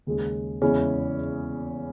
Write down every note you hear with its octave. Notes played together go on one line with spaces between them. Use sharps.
D#2 C#3 G#3 C#4
E2 C#3 G#3 C#4 E4